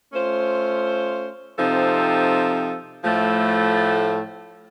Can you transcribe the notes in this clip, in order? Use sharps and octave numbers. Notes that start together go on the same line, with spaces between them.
A3 C#4 F4 C5
C3 F3 C4 D#4 A4
A2 F3 A3